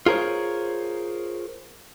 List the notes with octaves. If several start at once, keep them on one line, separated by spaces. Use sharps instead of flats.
F4 G#4 A#4 C5 C#5